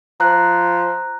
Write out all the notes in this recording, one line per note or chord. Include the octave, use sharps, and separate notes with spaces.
F3 A#5 F#6